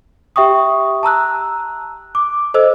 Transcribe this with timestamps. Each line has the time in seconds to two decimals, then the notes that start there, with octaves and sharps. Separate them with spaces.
0.36 G4 E5 G5 C#6 D#6
1.03 A5 A#5 E6 F#6
2.15 D6
2.54 A4 C5 D#5 E6